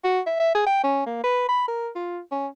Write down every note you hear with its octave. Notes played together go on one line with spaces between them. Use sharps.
F#4
E5
E5
G#4
G5
C#4
A#3
B4
B5
A#4
F4
C#4